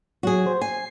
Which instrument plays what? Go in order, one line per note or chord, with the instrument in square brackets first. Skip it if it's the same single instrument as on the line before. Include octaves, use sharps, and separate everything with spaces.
[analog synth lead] F#3 [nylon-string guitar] F#4 G#4
[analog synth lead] C5
[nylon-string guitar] G#5 [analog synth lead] C7